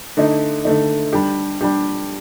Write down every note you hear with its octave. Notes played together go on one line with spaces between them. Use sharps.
D3 A3 D#4
D3 A3 D#4
G3 D4 G4
G3 D4 G4